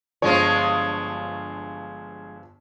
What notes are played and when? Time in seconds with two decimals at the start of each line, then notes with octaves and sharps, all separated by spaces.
0.22 G1 G2 F3 G#3 F4 C#5